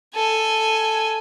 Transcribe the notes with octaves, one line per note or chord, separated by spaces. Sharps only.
A4 G#5